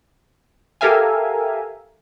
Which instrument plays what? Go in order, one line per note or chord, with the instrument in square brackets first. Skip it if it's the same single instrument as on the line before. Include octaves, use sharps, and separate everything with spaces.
[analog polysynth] G4 A4 A#4 E5 F5 G#5